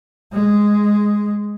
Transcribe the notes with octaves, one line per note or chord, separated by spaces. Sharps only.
G#3